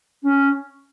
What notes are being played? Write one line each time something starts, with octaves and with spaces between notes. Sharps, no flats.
C#4